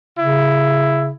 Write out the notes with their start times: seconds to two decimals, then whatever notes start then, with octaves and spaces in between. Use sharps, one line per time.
0.19 C#3 E4